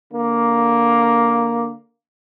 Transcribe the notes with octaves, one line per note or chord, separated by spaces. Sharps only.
D3 A#3